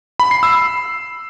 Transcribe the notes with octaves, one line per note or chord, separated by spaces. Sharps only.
B5
C7
E6